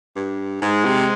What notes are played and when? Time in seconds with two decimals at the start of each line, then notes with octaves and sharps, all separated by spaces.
0.16 G2
0.61 G#2 G#3
0.85 C3